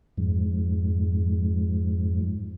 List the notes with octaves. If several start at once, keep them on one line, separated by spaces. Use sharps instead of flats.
F2 G#2